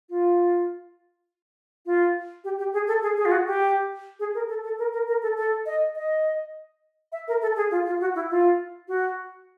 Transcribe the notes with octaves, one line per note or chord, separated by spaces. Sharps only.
F4
F4
G4
G4
G#4
A4
G#4
G#4
F4
F#4
G4
G#4
A#4
A4
A4
A#4
A#4
A#4
A4
A4
D#5
D#5
E5
A#4
A4
G#4
F4
F4
F#4
E4
F4
F#4